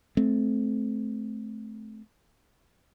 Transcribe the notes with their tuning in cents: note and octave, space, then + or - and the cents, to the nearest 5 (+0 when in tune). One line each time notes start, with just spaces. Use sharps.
A3 -25 C4 -5